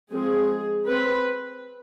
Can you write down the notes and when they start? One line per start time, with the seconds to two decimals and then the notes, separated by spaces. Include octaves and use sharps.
0.12 F3 G#3 C4 G#4
0.88 C4 B4